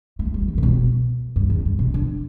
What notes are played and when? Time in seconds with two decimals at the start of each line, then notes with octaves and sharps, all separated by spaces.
0.19 A3
0.34 G3
0.48 E3
0.58 A2
0.63 B2
1.36 G2
1.50 E2
1.65 G2
1.79 B2
1.94 D3